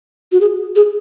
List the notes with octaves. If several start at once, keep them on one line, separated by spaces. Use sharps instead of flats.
F#4
G#4
G#4